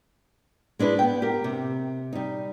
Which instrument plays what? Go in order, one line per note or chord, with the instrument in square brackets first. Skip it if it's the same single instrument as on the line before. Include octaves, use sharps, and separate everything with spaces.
[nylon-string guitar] G#3 D4 E4 B4
B3 G5
G4 A#4
C3
G3 D#4